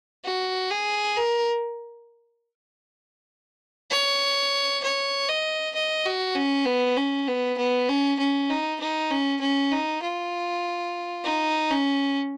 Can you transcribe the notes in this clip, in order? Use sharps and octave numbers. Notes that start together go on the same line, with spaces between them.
F#4
G#4
A#4
C#5
C#5
D#5
D#5
F#4
C#4
B3
C#4
B3
B3
C#4
C#4
D#4
D#4
C#4
C#4
D#4
F4
D#4
C#4